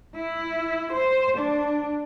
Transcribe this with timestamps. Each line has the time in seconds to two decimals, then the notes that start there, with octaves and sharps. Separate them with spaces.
0.16 E4
0.93 C5
1.38 D4